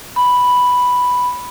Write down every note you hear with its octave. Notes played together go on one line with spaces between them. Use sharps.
B5